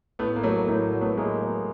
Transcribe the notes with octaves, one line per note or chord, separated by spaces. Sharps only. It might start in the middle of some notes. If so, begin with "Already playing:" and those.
A2 A3 B3
A#3
F#3 A3
A2 A3
F#3
A3 B3
A2 G#3 A#3
F#3 A3